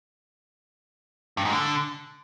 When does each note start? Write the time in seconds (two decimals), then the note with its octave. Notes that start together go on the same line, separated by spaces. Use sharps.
1.37 G2
1.45 G#2
1.53 D3